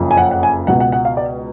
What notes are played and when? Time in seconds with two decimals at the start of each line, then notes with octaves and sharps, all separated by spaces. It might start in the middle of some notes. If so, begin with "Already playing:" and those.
Already playing: F#1 F2 C#3
0.11 G#5
0.17 F#5
0.31 F#5
0.43 G#5
0.67 C#2 B2 F#5
0.80 F#5
0.92 F#5
1.05 F5
1.17 D5